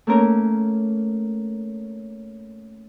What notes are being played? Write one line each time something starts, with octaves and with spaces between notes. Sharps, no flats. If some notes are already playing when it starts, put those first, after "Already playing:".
A3 A#3 C#4 A#4